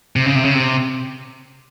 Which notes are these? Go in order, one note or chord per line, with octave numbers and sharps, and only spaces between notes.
C3
C#3
C3
C#3
C3